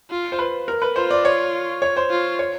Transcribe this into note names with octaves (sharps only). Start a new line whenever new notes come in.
F4
C5
B4
A#4
B4
F4 C5
D5
C#5
C#5
C5
F4
C#5